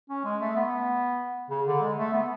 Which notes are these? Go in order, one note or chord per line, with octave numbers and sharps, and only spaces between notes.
C#4
G#3
A3
B3
C#3
D3
G#3
A3
B3